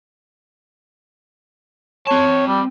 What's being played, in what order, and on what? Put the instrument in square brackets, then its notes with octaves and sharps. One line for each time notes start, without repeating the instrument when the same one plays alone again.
[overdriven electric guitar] C4 A5 [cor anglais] C#5
[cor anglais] G3